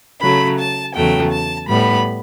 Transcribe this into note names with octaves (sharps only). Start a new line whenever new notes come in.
C#3 F#3 A3 B5
A5
E2 C#3 F#3 A3 G5
A5
A2 G3 B3 B5